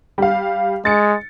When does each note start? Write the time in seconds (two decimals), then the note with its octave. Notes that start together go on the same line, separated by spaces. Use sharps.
0.18 G3 F5
0.85 G#3 A6 C#7